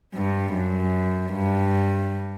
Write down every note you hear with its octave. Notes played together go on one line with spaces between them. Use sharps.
G2
F#2
G2